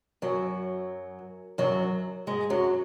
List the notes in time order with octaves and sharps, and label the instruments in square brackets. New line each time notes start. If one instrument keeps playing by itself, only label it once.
[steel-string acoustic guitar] F#2 F#3
F#2 F#3
G#2 G#3
F#2 F#3